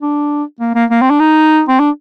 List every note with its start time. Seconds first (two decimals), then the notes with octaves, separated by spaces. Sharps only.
0.02 D4
0.60 A#3
0.75 A#3
0.90 A#3
1.02 C4
1.10 D4
1.20 D#4
1.68 C4
1.80 D4